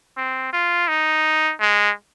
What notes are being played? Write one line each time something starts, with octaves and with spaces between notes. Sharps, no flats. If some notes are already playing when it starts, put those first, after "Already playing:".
C4
F4
D#4
G#3